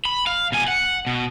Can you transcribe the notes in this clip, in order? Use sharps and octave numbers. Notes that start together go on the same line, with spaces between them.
B5
F5
B2 G#5
F#5
B2